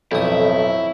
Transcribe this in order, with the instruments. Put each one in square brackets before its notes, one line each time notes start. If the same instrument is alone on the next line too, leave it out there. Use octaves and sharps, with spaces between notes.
[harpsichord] B1 D#6 [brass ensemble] F2 [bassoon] A2 [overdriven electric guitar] E4